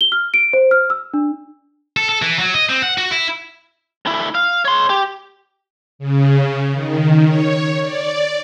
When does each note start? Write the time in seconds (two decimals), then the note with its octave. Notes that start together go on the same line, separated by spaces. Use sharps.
0.01 G7
0.12 F6
0.34 D7
0.53 C5
0.71 F6
0.90 E6
1.14 D4
1.97 A4
2.09 A4
2.22 E3
2.39 F#3
2.54 D#5
2.69 C4
2.82 F#5
2.98 F#4
3.11 E4
4.06 D2 E4
4.35 F5
4.65 C#5 C6
4.90 G4
5.99 C#3
6.71 D#3
7.25 C#5
7.82 D5